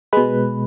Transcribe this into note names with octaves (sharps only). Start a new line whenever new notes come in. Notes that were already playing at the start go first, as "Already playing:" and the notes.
B2 G#3 B4